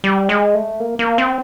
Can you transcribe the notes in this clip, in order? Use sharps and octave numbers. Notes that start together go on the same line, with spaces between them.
G3
G#3
A3
A#3
A#3
C4